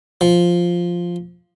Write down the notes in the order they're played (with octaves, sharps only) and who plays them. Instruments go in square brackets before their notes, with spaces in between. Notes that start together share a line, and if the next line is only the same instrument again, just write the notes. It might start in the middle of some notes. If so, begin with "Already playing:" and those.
[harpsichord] F3